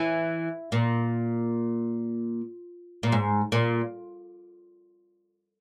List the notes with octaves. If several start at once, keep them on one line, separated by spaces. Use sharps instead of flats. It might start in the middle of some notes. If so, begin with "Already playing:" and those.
Already playing: E3
A#2
A#2
G#2
A#2